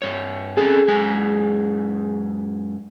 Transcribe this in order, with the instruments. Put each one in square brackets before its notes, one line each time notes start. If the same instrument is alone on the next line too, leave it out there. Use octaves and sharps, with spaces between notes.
[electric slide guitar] G2 C#5
[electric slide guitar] C4 C#4 A4 [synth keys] G#4
[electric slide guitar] F#2 G#3 G#5